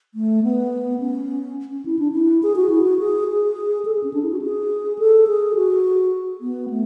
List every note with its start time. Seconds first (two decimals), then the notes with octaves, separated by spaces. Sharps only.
0.14 A3
0.43 B3
1.00 C#4
1.71 C#4
1.85 E4
1.99 D4
2.12 E4
2.43 G#4
2.56 F#4
2.69 E4
2.83 F#4
2.99 G#4
3.28 G#4
3.85 A4
3.94 G#4
4.04 C#4
4.13 D4
4.23 E4
4.32 F#4
4.42 G#4
4.99 A4
5.27 G#4
5.56 F#4
6.41 B3
6.70 A3